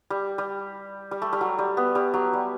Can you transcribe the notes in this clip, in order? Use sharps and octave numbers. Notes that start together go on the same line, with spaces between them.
G3
G3
G3
A3
G3
F#3
G3
B3
G3
F#3
G3